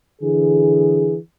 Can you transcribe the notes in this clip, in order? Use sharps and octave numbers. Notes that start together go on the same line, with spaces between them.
D3 E3 G#4